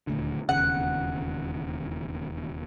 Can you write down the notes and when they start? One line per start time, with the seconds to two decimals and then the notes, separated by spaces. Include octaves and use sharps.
0.07 D#1 D2 D3
0.49 E1 D#2 C#3 F#5